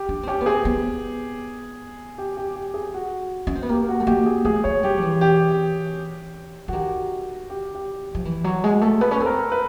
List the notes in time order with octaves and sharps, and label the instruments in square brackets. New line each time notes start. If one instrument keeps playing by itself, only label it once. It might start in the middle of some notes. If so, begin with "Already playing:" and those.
Already playing: [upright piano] G4
[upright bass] D4
C4
[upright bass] C#4 [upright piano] G4
[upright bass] B3
[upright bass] C4 [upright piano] G#4
[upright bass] B3
[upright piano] G4
G4
G4
G#4
F#4
[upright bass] C#4
C4
B3
[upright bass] A#3 [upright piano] G4
[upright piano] F#4
[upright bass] A3
[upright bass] A#3 [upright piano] G4
[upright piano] G#4
[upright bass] A3 [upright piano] G#4
[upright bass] A3 [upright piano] C#5
[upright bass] G3 [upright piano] G4
[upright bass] F3
E3
[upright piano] G4
[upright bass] E3 [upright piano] F#4
[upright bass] D#3 [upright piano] G4
[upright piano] G4
G4
[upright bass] F3
E3
[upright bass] F#3 [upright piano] F#4
[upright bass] G#3 [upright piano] G#4
[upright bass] A3 [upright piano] A4
[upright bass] B3 [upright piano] B4
[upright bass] C#4
[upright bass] C4 [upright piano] A4
[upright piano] A#4
B4